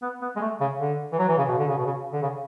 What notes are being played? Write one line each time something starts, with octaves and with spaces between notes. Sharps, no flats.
B3
B3
G#3
A3
C#3
D3
E3
F#3
E3
C#3
B2
D3
C#3
B2
C#3
D3
C#3